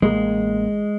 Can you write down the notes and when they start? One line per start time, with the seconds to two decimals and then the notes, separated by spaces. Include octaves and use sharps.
0.02 A1 G#3 A#3